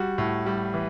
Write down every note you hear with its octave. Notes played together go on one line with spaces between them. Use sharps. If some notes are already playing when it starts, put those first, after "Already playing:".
Already playing: G3 F#4
A2
G3
E3